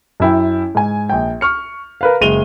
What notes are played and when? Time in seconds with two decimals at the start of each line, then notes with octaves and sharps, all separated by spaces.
0.20 F#2 E4 G5
0.75 G#2 G#5
1.09 A#1 G5
1.41 C#6 F6 C#7
2.01 A#4 B4 F5
2.21 F#1 G#3 D#7 F7 G7